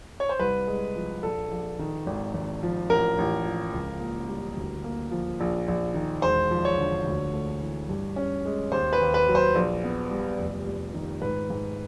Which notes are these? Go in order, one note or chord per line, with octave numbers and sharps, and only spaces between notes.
C#5
C5
C2 B4
G#3
F3
A#1 A4
A#1
D#3
G#1
G#1
F3
A1 A#4
A1
F3
C#2
A#3
G3
D2
A#3
F3
A#1
A#1
D#3
E1 C5
F3
C#5
D3
D2
A3
E3
G2
C#4
G#3
D#2 C5
B4
D#2
B4
F#3
C5
A#1
B3
G3
F1
G3
D#3
G#2 B4
G#2